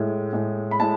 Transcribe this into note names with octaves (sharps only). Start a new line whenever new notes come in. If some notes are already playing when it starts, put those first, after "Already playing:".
Already playing: A2 G#3
A2 G#3
B5
A2 G#3 A5